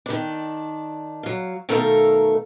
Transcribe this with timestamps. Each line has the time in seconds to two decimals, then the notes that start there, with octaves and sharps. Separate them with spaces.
0.06 D#3 D4
1.23 F#3 F5
1.69 B2 D#3 A3 A4 A#4 F5